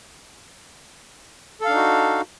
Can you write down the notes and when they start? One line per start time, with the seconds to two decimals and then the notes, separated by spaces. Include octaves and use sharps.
1.61 A4
1.65 F5
1.69 D4
1.73 D#4
1.77 F#4